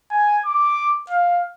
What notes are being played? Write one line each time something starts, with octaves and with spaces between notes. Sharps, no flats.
G#5
D6
F5